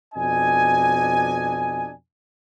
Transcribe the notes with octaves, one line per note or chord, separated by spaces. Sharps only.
F2 B2 D4 D#5 G#5